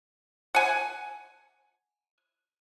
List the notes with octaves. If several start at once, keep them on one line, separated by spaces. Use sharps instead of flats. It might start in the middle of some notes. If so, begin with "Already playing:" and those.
F#5 G#5